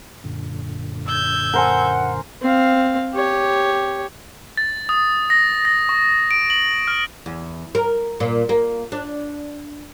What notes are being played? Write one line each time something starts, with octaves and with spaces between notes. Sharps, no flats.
F#2 A#2 D3
E6 G6 G#6
A#4 C5 F#5 G#5
C4 F5
G4 C#5
A6
D#6
A#6
A#6
C#6
D7
F#7
F6
E2
A#4
A#2
A#3
D4